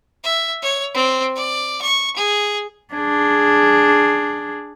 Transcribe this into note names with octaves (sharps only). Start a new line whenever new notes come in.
E5
C#5
C4
D5
C#6
G#4
D4 G#4